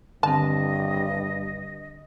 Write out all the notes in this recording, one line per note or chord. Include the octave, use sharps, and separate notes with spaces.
G2 D3 D#3 C4 D#5 A5